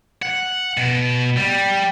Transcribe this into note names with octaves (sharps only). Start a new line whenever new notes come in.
F#5
B2
G3